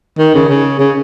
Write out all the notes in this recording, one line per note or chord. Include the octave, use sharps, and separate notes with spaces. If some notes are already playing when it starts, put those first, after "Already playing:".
D#3
C#3
C#3
C#3